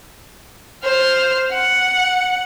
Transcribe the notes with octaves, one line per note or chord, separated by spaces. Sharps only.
C5 F6
F#5